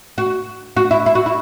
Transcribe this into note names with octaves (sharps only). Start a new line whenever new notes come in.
F#4
F#4
E4
E4
F#4
E4